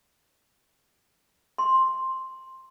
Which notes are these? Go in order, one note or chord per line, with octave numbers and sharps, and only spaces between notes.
C6